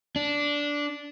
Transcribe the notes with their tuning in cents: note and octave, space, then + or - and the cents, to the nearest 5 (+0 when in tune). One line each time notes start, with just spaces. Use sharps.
D4 -10